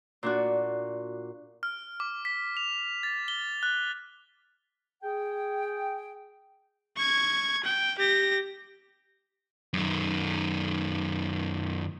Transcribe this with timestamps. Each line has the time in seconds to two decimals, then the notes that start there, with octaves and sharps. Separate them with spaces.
0.23 A#2 D4 F#4
1.63 F6
2.00 D6
2.25 B6
2.57 F7
3.03 A6
3.28 G7
3.63 F#6
5.03 G#4 G5
6.97 C#6 G#6
7.63 G5
7.98 G4 A#6
9.74 F#2 D#3